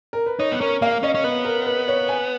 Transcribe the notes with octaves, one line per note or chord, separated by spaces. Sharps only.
A#4
B4
D#4 C#5
B3
C#4 A#4
A#3 F5
C#4 D#5
C#4
B3 B4
A#4
B4
C#5
G#5